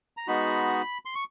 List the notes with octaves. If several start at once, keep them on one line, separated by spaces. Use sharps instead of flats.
A#5
G#3 B3 D#4 F#4 B5
C6
C#6